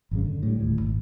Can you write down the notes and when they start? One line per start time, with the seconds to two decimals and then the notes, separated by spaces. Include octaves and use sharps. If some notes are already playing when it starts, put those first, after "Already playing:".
0.11 G#1 F#2 C#3
0.25 D3
0.43 A2 G3
0.60 D#1 A1 D2 A2
0.81 G#1